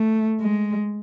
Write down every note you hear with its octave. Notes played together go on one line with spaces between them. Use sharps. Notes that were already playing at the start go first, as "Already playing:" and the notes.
Already playing: A3
G#3